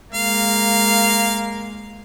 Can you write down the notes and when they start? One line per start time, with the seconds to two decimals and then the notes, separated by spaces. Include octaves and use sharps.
0.14 G#3 A#3 F5